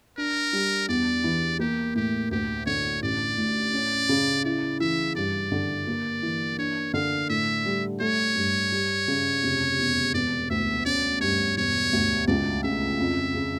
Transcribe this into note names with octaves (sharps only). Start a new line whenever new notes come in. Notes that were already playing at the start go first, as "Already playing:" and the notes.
D4 A#4
G3
E2 D5
E3
A#3 G4
A2 G4
D2 G4
D3 C#5
A1 D5
A2
C#4
C#3
E4 D5
E3 E5
G2 D5
D3
A#3
E3
D4 C#5
D3 F5
A2 E5
G3
A3 C#5
G2
G3
C#3
F1
E2
E1 D5
D2 E5
C#4 D5
G2 C#5
E1 C#5
D2
C#2 D5
C#3 E5
F2
C#3